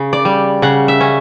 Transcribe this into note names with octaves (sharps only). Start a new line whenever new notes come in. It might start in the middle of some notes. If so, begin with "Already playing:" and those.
Already playing: C#3
D5
G3
C#3 F#5
E5
C#4